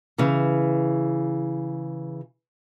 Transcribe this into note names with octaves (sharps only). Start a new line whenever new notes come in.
C#3 E3